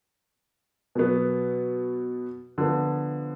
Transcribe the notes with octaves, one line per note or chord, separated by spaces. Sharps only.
B2 F#3 B3
D3 F3 B3